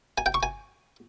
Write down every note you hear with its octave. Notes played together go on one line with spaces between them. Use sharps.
G#5
G5
C#6
G#5